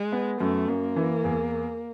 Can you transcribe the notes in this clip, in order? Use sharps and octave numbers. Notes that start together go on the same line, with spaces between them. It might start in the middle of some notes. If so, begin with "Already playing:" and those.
Already playing: G#3
B3
F#2 A3
F#2 A#3
E3
E2